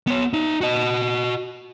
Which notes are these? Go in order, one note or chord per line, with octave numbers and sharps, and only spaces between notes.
B3 C#5
D#4 E5
F#4 D#5